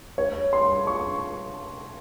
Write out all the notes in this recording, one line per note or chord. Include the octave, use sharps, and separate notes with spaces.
C#5
C6
C#6